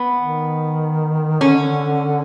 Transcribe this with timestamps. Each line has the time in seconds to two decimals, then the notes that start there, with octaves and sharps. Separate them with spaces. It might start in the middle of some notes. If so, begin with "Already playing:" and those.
Already playing: B3
0.20 D#3
1.41 D3 C#4